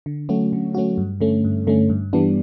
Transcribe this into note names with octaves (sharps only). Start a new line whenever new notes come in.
D3
F#3 A3 C#4 F#4
D3
F#3 A3 C#4 F#4
G2
D3 A3 C#4
G2
D3 A3 C#4
G2
E3 G3 B3 D4